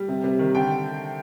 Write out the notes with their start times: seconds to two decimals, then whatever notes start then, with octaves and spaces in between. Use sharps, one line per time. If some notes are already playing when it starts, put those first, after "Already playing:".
Already playing: G3
0.08 C3
0.24 C3
0.39 D#3
0.55 D3 G5